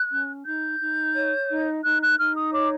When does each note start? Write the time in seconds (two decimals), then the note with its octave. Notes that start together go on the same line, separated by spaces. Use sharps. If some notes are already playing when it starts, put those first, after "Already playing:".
Already playing: F#6
0.11 C#4
0.46 D#4 G6
0.80 D#4
1.15 C#5
1.50 D#4
1.85 D#4 F#6
2.02 F#6
2.19 D#4 F6
2.36 D#6
2.53 C#5 D6